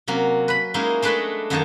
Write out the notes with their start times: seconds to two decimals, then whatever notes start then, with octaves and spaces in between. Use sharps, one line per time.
0.08 C3 F#3 A#3 C#4
0.48 B4 B5
0.74 G#3 A#3 C#4 D#4 E4
1.02 G#3 A3 D4 B4 C#5 D#5
1.50 F#2 D#3 A#3 C#5 D#5 A5